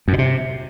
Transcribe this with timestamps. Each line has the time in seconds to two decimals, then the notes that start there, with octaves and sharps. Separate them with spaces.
0.08 F#2
0.13 B2
0.18 C3